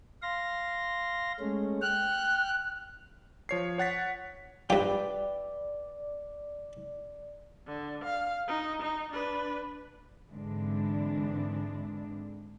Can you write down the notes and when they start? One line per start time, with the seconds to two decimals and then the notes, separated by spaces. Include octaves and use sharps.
0.22 F5 C6 A#6
1.40 G#3 A3 C#4
1.82 G5 F6 F#6
3.49 F3 C#5 C7
3.78 C#5 F#5 A6 B6
4.70 G2 F4 B4 D5 E5 G5
7.67 D3
8.04 F5
8.48 D#4
8.82 D#4
9.12 D4 B4
10.30 G#2 D3 E3 G#3 C4 D4